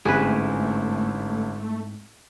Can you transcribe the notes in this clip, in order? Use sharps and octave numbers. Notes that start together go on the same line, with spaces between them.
G1 G#2 A3 C4 C#4 E4 G#4 B4